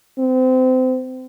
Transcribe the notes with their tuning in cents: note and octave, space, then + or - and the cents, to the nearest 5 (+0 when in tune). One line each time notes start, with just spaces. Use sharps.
C4 -30